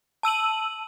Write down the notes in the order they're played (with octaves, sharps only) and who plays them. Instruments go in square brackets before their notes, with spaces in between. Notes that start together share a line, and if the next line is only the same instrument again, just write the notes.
[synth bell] A5 E6 D#7 F#7